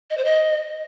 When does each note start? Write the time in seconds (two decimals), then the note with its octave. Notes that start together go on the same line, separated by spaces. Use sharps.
0.10 D#5
0.17 C5
0.25 D#5